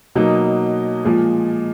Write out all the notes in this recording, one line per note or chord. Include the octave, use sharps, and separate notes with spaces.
B2 F#3 A#3 D#4
A#2 F3 G#3